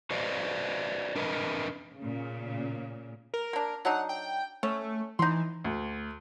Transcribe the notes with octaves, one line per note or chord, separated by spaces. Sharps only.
F#4 B4 C5 D5 D#5 F5
D4 A#4 B4 D#5
A#2 C#3
A#4
A#3 D4
F#3 D4 D#4 F#5
G5
A3 C#4
E3 D#4 C6
D2